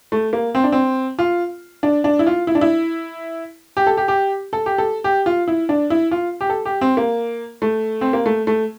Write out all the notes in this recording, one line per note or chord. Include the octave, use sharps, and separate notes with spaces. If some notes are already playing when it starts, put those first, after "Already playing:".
A3
A#3
C4
D4
C4
F4
D4
D4
E4
F4
E4
D4
E4
G4
A4
G4
G4
A4
G4
A4
G4
F4
E4
D4
E4
F4
G4
A4
G4
C4
A#3
A3
C4
A#3
A3
A3